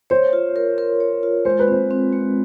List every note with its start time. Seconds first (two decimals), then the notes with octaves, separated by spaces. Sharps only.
0.10 C5 C#5
0.33 F4
0.56 A#4
0.78 A#4
1.00 C#5
1.23 F4
1.45 G#3 C5
1.59 B4
1.68 C4 C5
1.91 C4
2.13 G#3